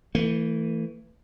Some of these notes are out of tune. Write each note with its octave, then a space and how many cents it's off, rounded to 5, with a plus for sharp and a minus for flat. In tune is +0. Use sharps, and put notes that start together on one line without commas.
E3 +0 A3 +35